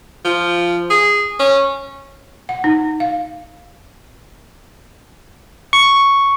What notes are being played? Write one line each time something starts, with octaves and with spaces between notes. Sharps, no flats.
F3
G#4
C#4
F#5
D#4
F5
C#6